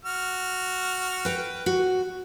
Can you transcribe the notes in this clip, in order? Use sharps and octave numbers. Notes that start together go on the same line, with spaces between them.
F#4 F6
B4 G5
F#4